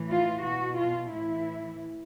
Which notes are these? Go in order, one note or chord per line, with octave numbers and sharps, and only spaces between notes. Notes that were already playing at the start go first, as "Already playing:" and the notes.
Already playing: A2 E3
F4
B2 F#4
F4
A2 E3 E4